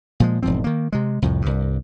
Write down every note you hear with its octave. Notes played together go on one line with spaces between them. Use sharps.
A#2 F3 G#3
E1 G#2 F3 C4
D#3 A#3
C3 G#3
C2 F2 A2
C2 G2